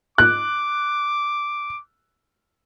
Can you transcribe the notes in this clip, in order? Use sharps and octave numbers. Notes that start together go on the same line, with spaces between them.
D6 F#6